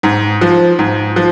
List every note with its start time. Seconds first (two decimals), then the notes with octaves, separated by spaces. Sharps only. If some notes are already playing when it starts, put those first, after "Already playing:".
0.03 G#2
0.41 F3
0.79 G#2
1.16 F3